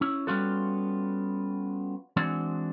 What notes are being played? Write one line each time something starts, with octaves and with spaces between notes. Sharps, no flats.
C#4 E4
G3 B3 C#4 F4 F#4 A4
E3 G#3 C4 D4 F#4